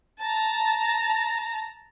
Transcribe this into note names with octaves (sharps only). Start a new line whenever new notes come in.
A5 A#5